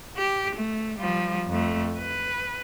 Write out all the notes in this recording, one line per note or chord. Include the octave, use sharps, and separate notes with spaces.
G4
A3
F3 G3
F2 A3
B4